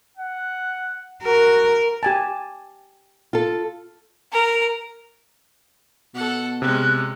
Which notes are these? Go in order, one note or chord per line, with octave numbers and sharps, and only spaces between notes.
F#5
F#4 A#4
G4 G#5 A5
F4 A4
A#4
B2 A4 F#5
C3 G#3 C#4 F#6